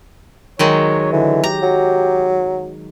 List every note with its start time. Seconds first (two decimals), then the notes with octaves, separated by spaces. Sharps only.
0.59 D#3 F#3 G#3 C#5
1.13 D3 E3
1.44 G4 A#5
1.62 F#3